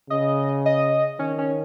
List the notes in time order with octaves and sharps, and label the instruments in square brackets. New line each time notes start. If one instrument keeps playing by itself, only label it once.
[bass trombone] C#3 [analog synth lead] D#5
[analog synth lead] D#5
[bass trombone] D#3 [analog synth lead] C#4
[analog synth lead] C#4